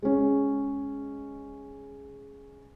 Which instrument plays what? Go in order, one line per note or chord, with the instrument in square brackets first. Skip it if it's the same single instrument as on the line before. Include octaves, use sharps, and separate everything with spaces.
[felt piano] G#3 C#4